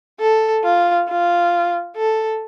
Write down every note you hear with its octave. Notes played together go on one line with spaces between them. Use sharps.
A4
F4
F4
A4